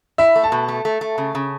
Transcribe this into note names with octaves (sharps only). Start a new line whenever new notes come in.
E4 E5
A3
A5
B2
A3
A3
A3
C#3
C#3